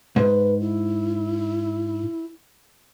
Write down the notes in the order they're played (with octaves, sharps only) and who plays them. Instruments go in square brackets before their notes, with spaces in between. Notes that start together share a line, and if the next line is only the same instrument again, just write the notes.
[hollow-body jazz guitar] G#2 [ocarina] B4
[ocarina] E4